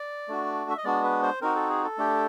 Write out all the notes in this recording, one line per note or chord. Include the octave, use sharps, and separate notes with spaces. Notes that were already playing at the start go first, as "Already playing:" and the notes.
Already playing: D5
A3 D4 F#4
E5
D#5
G#3 B3 D4 F#4 D5
B4
C5
C4 D#4 F#4 A#4
A4
G#4
A4
A3 D4 G4